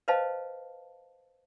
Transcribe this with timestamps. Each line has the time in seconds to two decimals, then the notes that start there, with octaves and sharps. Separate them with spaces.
0.08 B4 C5 D#5 F5 A5